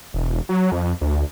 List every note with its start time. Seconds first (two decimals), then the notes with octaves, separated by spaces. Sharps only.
0.14 E1
0.49 F#3
0.72 F2
1.01 D2